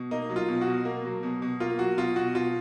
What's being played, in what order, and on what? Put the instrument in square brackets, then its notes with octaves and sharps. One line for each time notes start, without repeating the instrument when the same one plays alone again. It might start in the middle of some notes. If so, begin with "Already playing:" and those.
Already playing: [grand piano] B2
A#3 D#4
F#3
F4
B2
F#4
B2
A#3
F#3
B2
B2
A#3 F4
F#3 F#4
B2 F4
B2 F#4
B2 F4